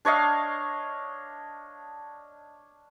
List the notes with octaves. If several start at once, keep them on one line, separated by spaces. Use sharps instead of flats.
D4 C#5 D#5 F5